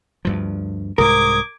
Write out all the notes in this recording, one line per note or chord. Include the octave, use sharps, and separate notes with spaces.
D2 G2 F3
C2 G#2 A#4 D6 D#6 G#6